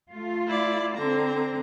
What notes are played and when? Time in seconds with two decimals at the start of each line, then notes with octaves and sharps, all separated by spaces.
0.12 A3 F4
0.47 E4 D5
0.97 D3 C4 A#5